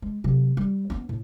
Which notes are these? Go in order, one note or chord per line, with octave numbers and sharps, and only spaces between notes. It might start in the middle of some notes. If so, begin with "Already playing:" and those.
G#3
C3 F#3
G3
B3 C#4
A2